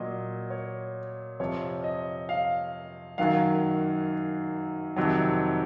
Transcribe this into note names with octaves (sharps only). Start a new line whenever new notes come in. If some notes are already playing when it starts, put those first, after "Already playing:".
Already playing: A#2 F#3 D#5
C#5
F2 C3 F3 C#5
D#5
F5
F#2 D#3 F#3 F5
F2 C3 D#3 F#3